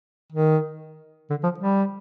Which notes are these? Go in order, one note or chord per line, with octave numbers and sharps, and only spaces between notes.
D#3
D3
F3
G3